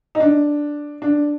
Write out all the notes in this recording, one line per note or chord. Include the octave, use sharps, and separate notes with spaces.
D#4
D4
D4